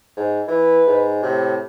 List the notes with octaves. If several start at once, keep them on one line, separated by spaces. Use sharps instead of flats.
G#2
E3 B4
G#2
A2 C3